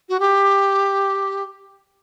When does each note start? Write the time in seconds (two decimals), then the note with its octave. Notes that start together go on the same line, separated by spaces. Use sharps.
0.09 F#4
0.20 G4